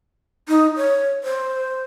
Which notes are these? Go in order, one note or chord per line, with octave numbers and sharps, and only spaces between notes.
D#4
C#5
C5